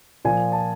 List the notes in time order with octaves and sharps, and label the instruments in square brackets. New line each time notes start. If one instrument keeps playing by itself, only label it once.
[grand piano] A#2 F3 G#5
A5